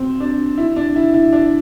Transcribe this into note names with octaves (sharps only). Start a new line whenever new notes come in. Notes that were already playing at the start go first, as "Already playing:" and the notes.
Already playing: C4
D4
E4
D4
E4
E4
D4